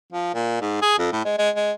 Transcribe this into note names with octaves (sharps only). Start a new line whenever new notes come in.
F3
A#2
G#2
G#4
F2
A2
G#3
G#3
G#3